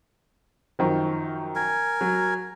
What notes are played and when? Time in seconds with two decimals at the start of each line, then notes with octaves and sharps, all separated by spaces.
0.79 F#2 D#3 F3
1.55 A#4 G#5
2.01 F#3